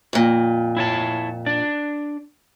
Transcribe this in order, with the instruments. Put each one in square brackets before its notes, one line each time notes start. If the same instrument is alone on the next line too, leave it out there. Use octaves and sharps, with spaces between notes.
[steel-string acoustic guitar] F2 A#2
[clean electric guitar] E4 C#5 A5
D4 D5